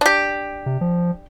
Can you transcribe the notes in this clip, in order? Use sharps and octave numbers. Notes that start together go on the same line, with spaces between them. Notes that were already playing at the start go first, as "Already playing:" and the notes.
D4 G4
C3
F3